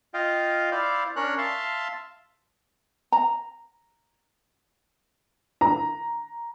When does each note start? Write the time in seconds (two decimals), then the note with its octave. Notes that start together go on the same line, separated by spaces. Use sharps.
0.14 F4 D#5 F5 G5
0.72 E4 C5 D5 F5
1.16 C#4 D4 A#4 C#5 F#6
1.38 E5 F5 A5 C6
3.12 A#5
5.61 A#5